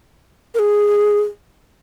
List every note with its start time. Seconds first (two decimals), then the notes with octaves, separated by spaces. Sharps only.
0.55 A#4
0.59 G#4